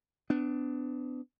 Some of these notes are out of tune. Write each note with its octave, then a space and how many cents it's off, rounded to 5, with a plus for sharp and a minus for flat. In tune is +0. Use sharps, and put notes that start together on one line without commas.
B3 +35 D4 +0